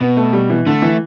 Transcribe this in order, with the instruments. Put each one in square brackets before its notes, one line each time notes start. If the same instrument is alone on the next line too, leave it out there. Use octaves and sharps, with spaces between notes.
[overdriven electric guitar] B2 [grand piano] B3
[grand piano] A3
G3
E3
[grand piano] D3 [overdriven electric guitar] A3
[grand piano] E3